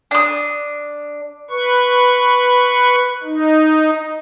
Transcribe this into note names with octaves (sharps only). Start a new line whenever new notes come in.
D4 D#6
B4 C#6
D#4